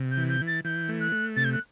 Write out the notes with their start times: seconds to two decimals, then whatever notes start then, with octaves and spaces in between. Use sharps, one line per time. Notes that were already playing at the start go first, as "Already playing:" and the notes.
Already playing: C3
0.11 G6
0.17 E3
0.29 G6
0.41 E3
0.47 A6
0.65 E3 G6
0.89 A3
1.00 F#6
1.12 A3
1.36 C3 A6
1.45 G6
1.53 F#6